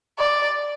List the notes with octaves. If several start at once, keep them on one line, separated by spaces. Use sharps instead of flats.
D5